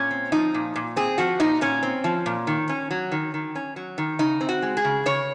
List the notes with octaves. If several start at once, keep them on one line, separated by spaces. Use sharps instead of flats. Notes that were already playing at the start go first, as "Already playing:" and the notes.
Already playing: A#2 C#4
C4
F3 D#4
A#2
A#2
C4 G#4
F3 F#4
A#2 D#4
A#2 C#4
C4
F3
A#2
D#3
C#4
F#3
D#3
D#3
C#4
F#3
D#3
C#3 D#4
C4
F#4
G#3
G#4
C#3
C#3 C#5